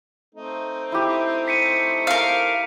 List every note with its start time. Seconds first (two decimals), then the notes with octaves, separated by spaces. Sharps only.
0.35 A3 C4 D#4
0.92 E4 G4
1.48 B6 C#7 D#7
2.07 A#4 F5